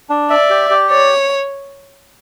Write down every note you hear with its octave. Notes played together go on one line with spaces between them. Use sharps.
D4
D5 E5
G4
G4
C#5 D5